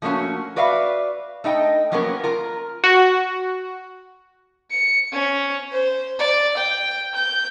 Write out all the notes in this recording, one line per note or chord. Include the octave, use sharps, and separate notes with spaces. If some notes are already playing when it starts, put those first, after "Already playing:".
F3 A3 A#3 C#4 F#4
F#4 B4 D5 E5 F5
A3 D#4 D#5 G5
F3 F#3 A#3 B3 C#4 A#4
F4 A#4 A#5
F#4
C#7
C#4
C5
D5
G5
G6